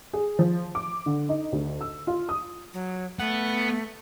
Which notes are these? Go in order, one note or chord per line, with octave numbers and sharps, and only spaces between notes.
G#4
F3
D6
D3
D#4
D2
E6
F4
D#6
F#3
A3 B3 F#5